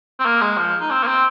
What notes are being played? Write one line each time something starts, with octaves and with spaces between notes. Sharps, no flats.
C4
A#3
G#3
F3
D#4
C4
A#3
C4